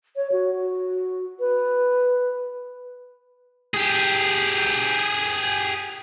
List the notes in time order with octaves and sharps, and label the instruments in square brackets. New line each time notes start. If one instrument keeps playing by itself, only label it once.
[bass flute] C#5
F#4
B4
[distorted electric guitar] G4 G#4